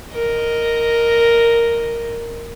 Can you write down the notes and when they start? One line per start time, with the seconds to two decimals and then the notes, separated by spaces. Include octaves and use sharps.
0.13 A#4 D#5